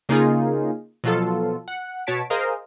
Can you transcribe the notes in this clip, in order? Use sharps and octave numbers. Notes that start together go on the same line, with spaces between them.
C#3 A#3 D#4 F4 G#4
B2 F3 F#3 F4 A4
F#5
B2 F#4 C#5 A5 B6 D7
G#4 A#4 C5 D#5 F5